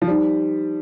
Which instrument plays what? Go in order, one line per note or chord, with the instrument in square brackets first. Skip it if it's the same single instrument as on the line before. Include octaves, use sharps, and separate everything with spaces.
[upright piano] F3
[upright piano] G3 [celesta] D#4 G4 C5